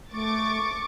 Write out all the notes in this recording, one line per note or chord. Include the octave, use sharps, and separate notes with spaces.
A3 C#6 D6 A6